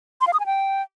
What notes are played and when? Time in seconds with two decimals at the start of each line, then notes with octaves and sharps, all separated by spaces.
0.21 C6
0.27 F5
0.33 D#6
0.40 G#5
0.46 G5